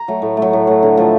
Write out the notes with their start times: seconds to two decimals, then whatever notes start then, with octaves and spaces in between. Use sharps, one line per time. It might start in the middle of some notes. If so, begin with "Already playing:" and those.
Already playing: A#5
0.08 F#3 A3
0.22 A2
0.37 A3
0.42 F#3
0.53 A2
0.67 F#3 A3
0.83 D3
0.97 F3 A3